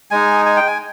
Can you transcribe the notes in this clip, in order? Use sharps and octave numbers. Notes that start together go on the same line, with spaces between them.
G#3 D#4 G#5
G#5
G5
G#5